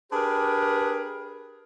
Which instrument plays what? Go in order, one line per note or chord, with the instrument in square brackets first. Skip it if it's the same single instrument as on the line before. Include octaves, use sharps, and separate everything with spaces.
[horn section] D4 G4 G#4 A#4 B4